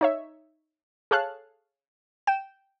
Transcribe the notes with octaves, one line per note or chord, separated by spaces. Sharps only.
D#4 C#5 E5
G#4 A4 C#5 F5 A5 F#6
G5 E7